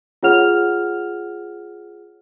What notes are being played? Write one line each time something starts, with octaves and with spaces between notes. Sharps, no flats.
F4 G#4 C#5 F#5 F6 F7